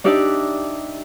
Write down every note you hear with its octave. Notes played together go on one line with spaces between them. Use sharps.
D4 D#4 G4 D5 E5